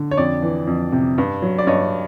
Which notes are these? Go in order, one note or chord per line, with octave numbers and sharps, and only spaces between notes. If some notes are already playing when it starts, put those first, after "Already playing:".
Already playing: D3
C#5
F2 D5
E3
F2
C3
G2
F#3
D5
G2 C#5 D#5